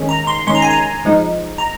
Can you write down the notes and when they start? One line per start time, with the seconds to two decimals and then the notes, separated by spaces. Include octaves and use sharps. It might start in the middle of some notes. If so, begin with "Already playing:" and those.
Already playing: D#3 G#3 C#4
0.09 A#5
0.27 C6
0.47 D#3 G#3 C#4 C6
0.55 A#5
0.62 G#5
0.70 A#5
1.05 F3 G#3 D#4
1.58 A#5